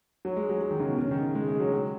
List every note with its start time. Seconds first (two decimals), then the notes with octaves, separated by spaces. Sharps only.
0.25 F#3
0.36 G#3
0.50 F#3
0.61 F#3
0.71 D#3
0.80 C#3
0.89 B2
0.99 C#3
1.11 D#3
1.35 G#3
1.48 G#3
1.60 F#3
1.72 F#3